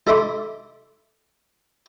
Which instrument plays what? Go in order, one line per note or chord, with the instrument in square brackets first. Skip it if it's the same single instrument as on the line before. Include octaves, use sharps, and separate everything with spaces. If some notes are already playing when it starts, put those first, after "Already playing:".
[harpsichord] D#4 A4 E5 B5 C6 D6